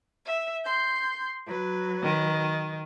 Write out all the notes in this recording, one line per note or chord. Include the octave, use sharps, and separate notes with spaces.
E5
C6 G6
F#3 B4
D#3